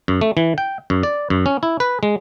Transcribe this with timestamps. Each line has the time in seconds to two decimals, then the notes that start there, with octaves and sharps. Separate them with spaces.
0.08 F#2
0.21 A3
0.37 E3
0.58 G5
0.90 F#2
1.03 D5
1.30 F#2
1.46 C#4
1.63 E4
1.80 B4
2.03 G#3